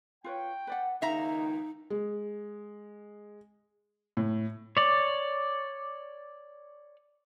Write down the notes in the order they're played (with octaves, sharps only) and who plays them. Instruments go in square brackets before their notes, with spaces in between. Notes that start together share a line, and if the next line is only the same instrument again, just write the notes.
[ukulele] F4 B4 C#5 [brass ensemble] G5
[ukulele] B4 D5 F#5
[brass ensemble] C#2 D#3 A#3 [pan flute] D#4 [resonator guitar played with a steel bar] E5 A#5 [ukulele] F5
[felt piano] G#3
A2
[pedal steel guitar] C#5 D5